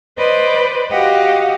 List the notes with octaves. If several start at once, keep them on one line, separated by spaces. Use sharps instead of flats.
B4 C5 D5 D#5
F#4 G4 D#5 F5 F#5